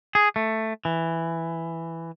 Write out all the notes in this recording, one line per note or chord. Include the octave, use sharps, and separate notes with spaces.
G#4
A3
E3